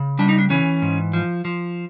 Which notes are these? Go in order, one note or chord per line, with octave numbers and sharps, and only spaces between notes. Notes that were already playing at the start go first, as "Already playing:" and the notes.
Already playing: C#3
G3 D4
D#4
D4
E3 C#4
G#2
F3
F3